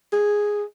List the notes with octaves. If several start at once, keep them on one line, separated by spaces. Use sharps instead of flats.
G#4